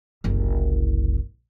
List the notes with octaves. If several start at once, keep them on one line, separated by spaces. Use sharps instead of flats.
F#1 C2